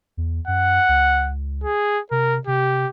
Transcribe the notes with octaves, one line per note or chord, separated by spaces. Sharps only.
E2
F#2 F#5
C#2
G#4
C3 A#4
C3 G4